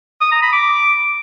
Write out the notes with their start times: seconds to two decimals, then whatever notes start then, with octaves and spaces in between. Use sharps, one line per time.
0.21 D#6
0.32 A#5
0.42 B5
0.53 D6